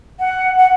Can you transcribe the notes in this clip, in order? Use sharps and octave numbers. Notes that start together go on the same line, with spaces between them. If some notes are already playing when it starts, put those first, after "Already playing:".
F#5
F#5